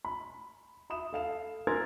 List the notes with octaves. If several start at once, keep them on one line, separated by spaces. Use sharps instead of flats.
B5
E5 B5 D#6 E7
A4 F5 E7
A#4 G#5 C6 E6 G#6 A6